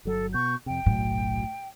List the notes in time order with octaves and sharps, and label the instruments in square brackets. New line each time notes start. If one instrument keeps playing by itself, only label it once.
[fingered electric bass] G1 F#3 [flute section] A4
[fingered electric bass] B2 [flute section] C#6 G6
[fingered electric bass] F2 C3 [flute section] G5
[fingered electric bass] F#1 B1 F#3 [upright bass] A2